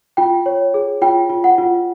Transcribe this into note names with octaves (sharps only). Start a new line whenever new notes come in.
F4 G5
C#5
G#4
F4 G5
F4
F#5
F4